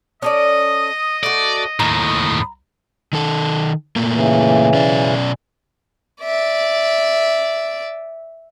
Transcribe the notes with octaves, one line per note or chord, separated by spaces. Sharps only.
C#4 A4 D5 D#5 D#6
A3 F#4 D5
D#2 A2 A#5 D#6
D#3 A4
A#2 A3 A#3
C#3 E3
B2 C#4 D5
D5 E5